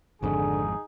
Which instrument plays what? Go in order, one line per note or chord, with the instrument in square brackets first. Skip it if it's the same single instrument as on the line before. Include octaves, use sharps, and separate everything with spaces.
[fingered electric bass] G#1 F2 G#2 [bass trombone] D3 [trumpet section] D#4 G#4 G#5